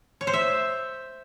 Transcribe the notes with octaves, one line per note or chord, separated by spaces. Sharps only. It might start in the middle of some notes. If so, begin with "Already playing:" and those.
C#5
C5
E5